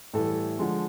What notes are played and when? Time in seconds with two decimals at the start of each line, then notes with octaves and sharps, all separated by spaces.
0.14 A2 E3 G3 A4
0.59 D3 F3 G#3